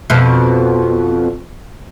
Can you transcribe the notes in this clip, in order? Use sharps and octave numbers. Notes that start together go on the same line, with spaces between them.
F2 B2